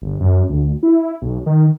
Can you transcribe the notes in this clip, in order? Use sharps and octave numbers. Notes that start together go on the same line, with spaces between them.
G1
F#2
D2
E4
B1
D#3